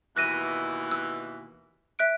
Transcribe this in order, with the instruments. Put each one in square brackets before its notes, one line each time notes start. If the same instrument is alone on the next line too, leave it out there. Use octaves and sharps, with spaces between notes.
[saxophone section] D#2 B2 E3 [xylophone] F#6 A#6 D#7
[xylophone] E6
E5 F#6 D7